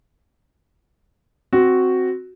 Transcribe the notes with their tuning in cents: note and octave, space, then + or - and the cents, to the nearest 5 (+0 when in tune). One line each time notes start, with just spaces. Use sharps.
C4 +0 F#4 +0